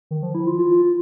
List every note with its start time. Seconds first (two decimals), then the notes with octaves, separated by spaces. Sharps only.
0.11 D#3
0.23 F3
0.35 E4
0.47 F4
0.59 F4